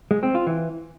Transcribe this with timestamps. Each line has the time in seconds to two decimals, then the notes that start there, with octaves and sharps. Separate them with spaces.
0.11 G#3
0.23 C4
0.35 F4
0.47 E3